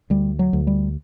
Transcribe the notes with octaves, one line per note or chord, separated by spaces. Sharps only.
D2 G3
F#3
D2
G3